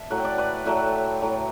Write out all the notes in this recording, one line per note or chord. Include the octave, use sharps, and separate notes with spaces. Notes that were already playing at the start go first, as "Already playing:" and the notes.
Already playing: E5 A5
A2 F#3 A3 F#5
G5
D5 F#5
B4 D5
A2 F#3 A3 E5 G5
A2 F#3 A3